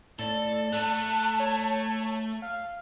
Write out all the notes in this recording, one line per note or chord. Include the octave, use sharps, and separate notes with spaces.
A2 A4 D5
A3 A5 F#6
C#5
F5